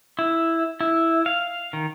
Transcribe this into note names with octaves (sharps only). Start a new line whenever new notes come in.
E4
E4
F5
D#3